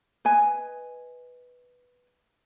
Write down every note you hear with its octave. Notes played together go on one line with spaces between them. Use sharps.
B4 D#5 G#5